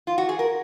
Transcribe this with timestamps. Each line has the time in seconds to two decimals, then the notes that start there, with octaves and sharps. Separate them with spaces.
0.07 F4
0.18 F#4
0.29 G#4
0.39 A#4